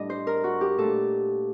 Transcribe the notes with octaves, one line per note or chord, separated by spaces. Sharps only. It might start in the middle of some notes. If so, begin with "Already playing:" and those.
Already playing: A2 G3 D4 D#5
C5
A#4
F#4
G4
A#2 A3 D4 A4